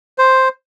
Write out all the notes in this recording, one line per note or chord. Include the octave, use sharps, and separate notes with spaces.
C5